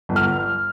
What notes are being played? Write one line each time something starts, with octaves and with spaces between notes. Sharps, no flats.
G1
F6